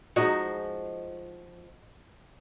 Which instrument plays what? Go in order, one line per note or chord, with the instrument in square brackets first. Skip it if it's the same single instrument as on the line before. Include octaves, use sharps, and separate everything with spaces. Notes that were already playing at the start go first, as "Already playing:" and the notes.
[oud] F3 G#3 D#4 [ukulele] F#4 D#5